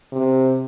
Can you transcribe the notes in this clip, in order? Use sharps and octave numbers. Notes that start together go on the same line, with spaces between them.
C3